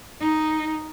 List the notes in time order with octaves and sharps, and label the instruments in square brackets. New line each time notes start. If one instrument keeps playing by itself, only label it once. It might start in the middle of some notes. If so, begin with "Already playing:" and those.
[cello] D#4